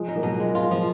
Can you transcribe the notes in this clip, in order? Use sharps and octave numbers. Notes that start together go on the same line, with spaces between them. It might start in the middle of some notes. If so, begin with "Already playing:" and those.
Already playing: F3 G#3
D#4
F#3 A#3
B2
G#3
F4
F3